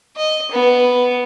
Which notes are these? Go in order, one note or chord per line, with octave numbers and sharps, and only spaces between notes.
D#5
B3